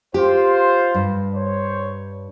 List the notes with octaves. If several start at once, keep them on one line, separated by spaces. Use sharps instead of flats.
F4 G4 C5
G2
C5 C#5